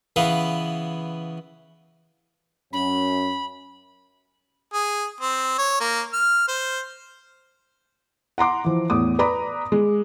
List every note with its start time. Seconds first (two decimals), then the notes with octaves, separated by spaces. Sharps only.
0.16 C#3 E3 B3 B4 F5
2.73 F#2 C#4 B5
4.74 G#4
5.21 C4
5.59 C#5
5.80 A#3
6.13 F6
6.48 C5
8.38 F#5 A#5 C6 D6
8.65 E3 F3
8.90 E2 A2 D6 D#6
9.19 B4 D5 A#5 B5 D6 D#6
9.72 G#3